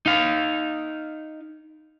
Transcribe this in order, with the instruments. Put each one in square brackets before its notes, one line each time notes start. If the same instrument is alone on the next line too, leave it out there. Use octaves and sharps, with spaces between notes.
[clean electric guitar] D#4 F5